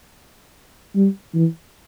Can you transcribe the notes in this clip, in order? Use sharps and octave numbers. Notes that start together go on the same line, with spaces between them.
G3
E3